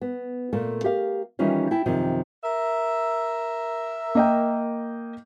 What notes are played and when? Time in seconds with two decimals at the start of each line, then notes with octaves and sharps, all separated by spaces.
0.02 B3
0.53 A#2 A3 A#3 A4
0.84 G4 A#4 F5
1.39 D#3 E3 G3 C#4 D#4 F4
1.71 E4 G5 A5
1.86 F#2 C3 D#3 F3
2.44 A#4 E5
4.15 A#3 D#5 G5